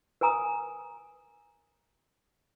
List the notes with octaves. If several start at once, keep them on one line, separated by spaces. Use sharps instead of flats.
A#4 B4 G#5 A#5 D#6